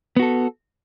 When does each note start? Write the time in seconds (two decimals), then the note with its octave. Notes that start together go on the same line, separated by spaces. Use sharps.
0.17 B3
0.19 F#4
0.22 A4